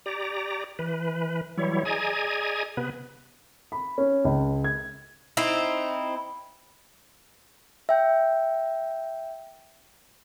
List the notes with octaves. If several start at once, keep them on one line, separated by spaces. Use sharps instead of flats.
G4 D5 A#5
E3 B4
E3 F#3 G3 E4 C#5
G#4 D5 D#5 G#5 A#5 G#6
C3 B3 B4
B5
C#4
C#2
G#6
C4 D#4 E4
E5 G5 G6